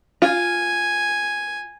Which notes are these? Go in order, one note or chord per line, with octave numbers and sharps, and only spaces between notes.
F4 G#5